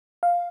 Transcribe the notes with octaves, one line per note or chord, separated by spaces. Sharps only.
F5